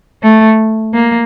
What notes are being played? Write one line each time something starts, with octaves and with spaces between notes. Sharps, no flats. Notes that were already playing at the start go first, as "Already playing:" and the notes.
A3
A#3